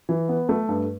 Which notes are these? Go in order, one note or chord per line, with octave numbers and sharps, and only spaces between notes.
E3
B3
A3
G2